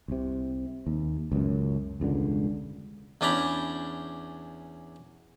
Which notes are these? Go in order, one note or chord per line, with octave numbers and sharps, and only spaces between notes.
C2 C3
D#2
C#2 F#2
E1 C#2 G2 D3
E2 C#4 D4 G5 A#5 B5